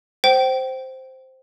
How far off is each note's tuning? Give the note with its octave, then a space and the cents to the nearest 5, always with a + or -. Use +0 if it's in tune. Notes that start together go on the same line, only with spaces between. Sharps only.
C5 +0 G5 -30